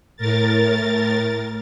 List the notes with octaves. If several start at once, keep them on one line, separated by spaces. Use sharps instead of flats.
A2 A#4 A6